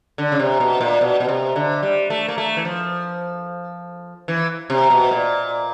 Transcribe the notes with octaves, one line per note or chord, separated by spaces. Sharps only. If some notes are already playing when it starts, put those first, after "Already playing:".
D3
C#3
C3
B2
A#2
B2
B2
C3
D3
G3
A3
A#3
A3
E3
F3
E3
C3
B2
A#2